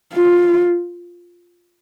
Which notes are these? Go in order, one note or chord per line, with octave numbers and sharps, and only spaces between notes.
F4